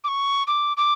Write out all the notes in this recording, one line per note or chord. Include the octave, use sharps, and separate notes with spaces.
D6
C#6
D6
D6